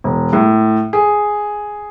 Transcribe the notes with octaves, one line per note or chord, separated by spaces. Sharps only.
E1
A2
G#4